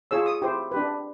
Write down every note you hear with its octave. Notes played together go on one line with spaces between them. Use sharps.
F4 G#4 C#5 E6
D#6
E4 G4 C5
D4 G4 B4